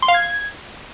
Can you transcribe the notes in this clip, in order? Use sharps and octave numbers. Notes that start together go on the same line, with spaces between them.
C6
F5
G#6